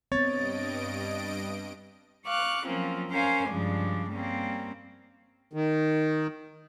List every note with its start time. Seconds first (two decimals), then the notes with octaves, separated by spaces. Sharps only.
0.12 G2 B3 C4 C#5 D#5 A6 D7
2.27 F5 C#6 D6 F#6
2.66 F3 F#3 A#3 C4 C#4 F4
3.11 C#4 A#4 C5 C#5 F5 G#5
3.49 G2 C#3 F3 G#3 D4
4.11 G3 A#3 C4 C#4
5.53 D#3